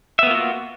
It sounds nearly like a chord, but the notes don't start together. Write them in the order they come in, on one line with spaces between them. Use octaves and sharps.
E5 B3 A#3 F4 F#4